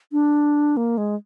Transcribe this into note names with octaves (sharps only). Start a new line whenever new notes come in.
D4
A#3
G#3